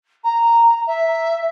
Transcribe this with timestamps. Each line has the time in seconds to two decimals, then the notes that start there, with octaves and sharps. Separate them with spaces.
0.24 A#5
0.87 E5